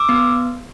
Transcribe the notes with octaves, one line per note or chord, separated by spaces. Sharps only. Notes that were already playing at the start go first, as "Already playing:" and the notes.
Already playing: D6 E6
B3